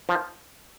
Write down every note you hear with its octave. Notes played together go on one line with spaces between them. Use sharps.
F3